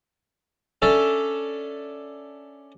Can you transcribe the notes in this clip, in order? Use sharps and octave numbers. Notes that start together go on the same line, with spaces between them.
C#4 D4 A4 E5